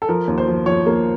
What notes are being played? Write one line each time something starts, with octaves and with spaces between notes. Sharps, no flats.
A4
F3 A#4
D#2
C5
F3
F3 C#5
A#3